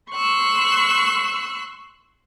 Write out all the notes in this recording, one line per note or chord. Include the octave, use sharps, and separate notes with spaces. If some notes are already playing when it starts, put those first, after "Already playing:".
C6 C#6 E6 F#6